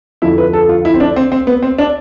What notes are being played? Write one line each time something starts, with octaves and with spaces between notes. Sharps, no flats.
F2 D3 F3 E4
B4
A4
F4
E4
C4
D4
C4
C4
B3
C4
D4